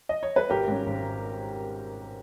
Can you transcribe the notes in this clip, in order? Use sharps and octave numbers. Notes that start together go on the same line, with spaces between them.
D#5
C#5
B4
G#1 G4 A#4
G#2 G3 C#4
G#1